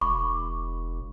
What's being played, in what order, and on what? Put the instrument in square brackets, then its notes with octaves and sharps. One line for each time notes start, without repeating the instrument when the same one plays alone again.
[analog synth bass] E1 [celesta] B5 C#6 D6